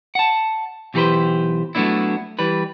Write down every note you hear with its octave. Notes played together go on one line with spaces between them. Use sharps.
F#5 A5
B1 E3 G4 G#4 B4 C5
F#3 A3 B3 C4 D4 E4
E3 G3 B4